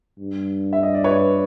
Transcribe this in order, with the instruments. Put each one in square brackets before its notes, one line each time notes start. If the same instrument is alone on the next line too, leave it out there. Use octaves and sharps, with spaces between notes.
[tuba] G2
[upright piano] E5
D#5
D5
B4 C#5